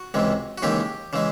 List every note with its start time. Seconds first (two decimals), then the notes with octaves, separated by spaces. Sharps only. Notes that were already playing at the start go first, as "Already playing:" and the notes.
Already playing: F#4
0.14 C#2 C3 E3 G#3
0.58 F#4
0.62 D#2 C#3 E3 G#3 G4
1.13 C#3 E3 G#3